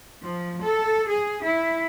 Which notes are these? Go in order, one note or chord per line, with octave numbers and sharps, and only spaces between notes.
F3
A4
G#4
E4